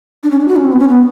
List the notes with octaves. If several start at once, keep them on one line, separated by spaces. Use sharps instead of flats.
D4
C#4
D4
F#4
C#4
C4
B3
C#4
B3